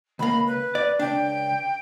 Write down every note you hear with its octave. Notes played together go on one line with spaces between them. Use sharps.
C#2 A#3 B5
B4
D5
C#2 D4 G5